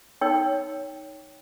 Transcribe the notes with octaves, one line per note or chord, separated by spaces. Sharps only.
D#4 C#5 G5 E6